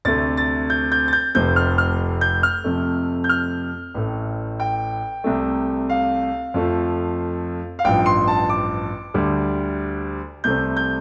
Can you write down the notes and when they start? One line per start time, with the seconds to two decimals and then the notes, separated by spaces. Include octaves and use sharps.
0.05 D2 C3 A3 A6
0.37 A6
0.70 G6
0.92 G6
1.08 A6
1.13 G6
1.35 F1 F2 C3 A3 C4 G6
1.56 F6
1.78 F6
2.21 G6
2.43 F6
2.64 F2 C3 A3
3.24 G6
3.29 F6
3.94 A1 A2 A3
4.60 G5
5.24 C2 C3 A3
5.89 F5
6.54 F2 F3 A3
7.79 F5
7.84 A1 G2 F3 G5
8.06 C6
8.28 A5
8.49 D6
9.14 D2 D3 G3
10.44 C2 C3 A3 C4 G6
10.77 G6